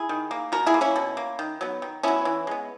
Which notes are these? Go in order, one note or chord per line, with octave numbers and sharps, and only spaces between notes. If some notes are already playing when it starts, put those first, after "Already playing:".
Already playing: E4 G#4
D#3
A#3
B2 F#4 A#4
E4 G#4
A#3
C#4 E4
B2
A#3
D#3
F#3 B3
D#3
F#3 B3 C#4 E4
E3
G#3 B3